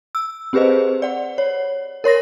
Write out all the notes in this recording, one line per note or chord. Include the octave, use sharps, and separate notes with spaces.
E6
C4 G4 G#4 B4 C5 D#5
D5 F#5
C#5
A#4 C#5 C6 A#6